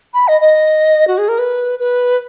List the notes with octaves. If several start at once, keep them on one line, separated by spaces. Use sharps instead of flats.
B5
D#5
D#5
F#4
G#4
A#4
B4
B4